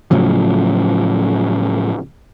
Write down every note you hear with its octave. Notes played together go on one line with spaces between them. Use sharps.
A2 C#3 F3 F#3